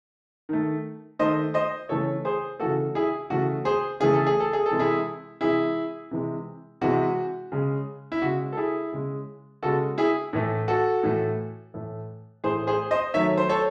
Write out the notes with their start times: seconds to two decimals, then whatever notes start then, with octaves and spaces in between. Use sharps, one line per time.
0.49 D#3 A3
1.19 D#3 A3 C5 D#5
1.54 C5 D#5
1.89 C#3 E3 A3 A4 C#5
2.25 G#4 C5
2.60 C#3 E3 A3 F#4 A4
2.95 E4 G#4
3.30 C#3 E3 A3 F#4
3.65 G#4 C5
4.00 C#3 E3 A3 G#4
4.14 A4
4.26 G#4
4.40 A4
4.53 G#4
4.66 A4
4.71 C3 E3 G#3
4.79 E4 G#4
5.41 C3 E3 G#3 E4 G#4
6.11 C3 E3 G#3
6.81 C3 E3 G#3 F#4
7.52 C#3 G#3
8.12 E4
8.22 C#3 G#3 F#4
8.53 A4
8.57 E4 G#4
8.92 C#3 G#3
9.63 C#3 G#3 F#4 A4
9.98 E4 G#4
10.33 A2 E3 A3
10.68 F#4 A4
11.03 A2 E3 A3
11.74 A2 E3 A3
12.44 A2 E3 A3 G#4 C5
12.67 G#4 C5
12.91 C5 D#5
13.14 D#3 F#3 A3 C#5 E5
13.38 C5
13.49 A4 C#5